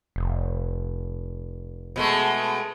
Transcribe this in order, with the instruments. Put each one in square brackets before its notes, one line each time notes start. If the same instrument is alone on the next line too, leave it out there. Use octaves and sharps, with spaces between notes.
[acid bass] F1
[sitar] B2 G#3 A3